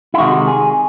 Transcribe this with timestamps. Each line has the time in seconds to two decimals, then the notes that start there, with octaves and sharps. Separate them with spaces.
0.14 E4
0.18 C3 D#3 G#3 F#4
0.47 G#4